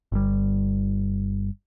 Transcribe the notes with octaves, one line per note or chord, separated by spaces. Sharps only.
G1 G3